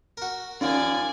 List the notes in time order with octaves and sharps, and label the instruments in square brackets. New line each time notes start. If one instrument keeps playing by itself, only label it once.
[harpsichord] F#4 A#4
[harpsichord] D#2 F3 A#3 [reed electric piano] C#4 D#4 [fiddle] D5 G#5